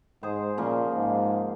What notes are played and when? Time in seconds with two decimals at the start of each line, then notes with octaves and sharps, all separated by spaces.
0.23 G#2 G#4 C5
0.58 A#2 C#3 F3 A#3
0.95 G#2